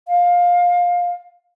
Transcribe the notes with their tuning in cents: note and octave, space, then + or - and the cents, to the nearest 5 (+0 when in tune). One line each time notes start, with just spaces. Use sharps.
F5 +20